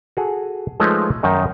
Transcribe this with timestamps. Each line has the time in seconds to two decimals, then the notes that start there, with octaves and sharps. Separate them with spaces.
0.17 F#4 G#4 A4
0.80 F3 G#3 A3 D#4 B4 C#5
1.23 F#2 D#3 D#4